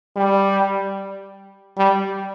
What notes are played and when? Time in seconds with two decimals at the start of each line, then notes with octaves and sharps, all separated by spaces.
0.16 G3
1.77 G3